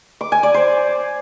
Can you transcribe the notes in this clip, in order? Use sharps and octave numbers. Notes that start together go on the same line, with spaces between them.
D6
G#5
D5
C5